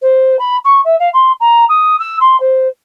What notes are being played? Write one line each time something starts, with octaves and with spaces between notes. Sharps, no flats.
C5
B5
C#6
E5
F5
C6
A#5
D#6
E6
C6
C5